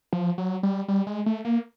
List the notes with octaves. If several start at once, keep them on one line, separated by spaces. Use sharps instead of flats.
F3
F#3
G3
G3
G#3
A3
A#3